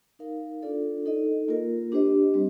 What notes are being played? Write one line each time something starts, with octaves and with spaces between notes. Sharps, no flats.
D#4 A#4 F5
D4 F4 A4 D5
D#4 A4 D#5
A#3 F4 A#4
D4 G4 C5 D#5
G3 C4